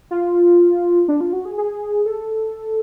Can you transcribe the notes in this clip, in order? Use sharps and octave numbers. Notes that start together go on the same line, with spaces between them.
F4
D4
F4
F#4
G#4
G#4
A4